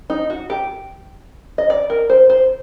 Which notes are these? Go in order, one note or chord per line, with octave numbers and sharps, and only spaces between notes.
D#4
F#4
G4
D#5
D5
A#4
C5
C5